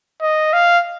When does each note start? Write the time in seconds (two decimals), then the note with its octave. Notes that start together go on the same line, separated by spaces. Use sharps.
0.22 D#5
0.53 F5